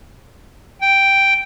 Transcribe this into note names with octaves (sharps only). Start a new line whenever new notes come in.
G5